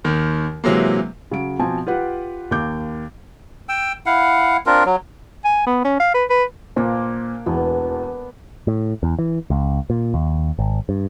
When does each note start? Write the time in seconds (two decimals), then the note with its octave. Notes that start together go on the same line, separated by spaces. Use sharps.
0.04 D#2 D#3
0.64 C3 E3 F#3 G#3 A#3
1.31 C#3 F#3 D7
1.59 B2 F3 C4 G#5 A5
1.87 F4 G4 B4 F#5
2.51 D#2 A#3 D6 G6
3.69 G5 E6
4.06 E4 F5 F#5
4.66 C4 D4 F4 A#4
4.86 F#3
5.45 G#5
5.66 B3
5.85 C#4
6.00 F5
6.14 B4
6.30 B4
6.76 A#2 A#3 D4 C5
7.46 E1 E2 B3
8.67 A2
9.03 E2
9.19 E3
9.50 C#2
9.90 A#2
10.14 D#2
10.59 G#1
10.89 G2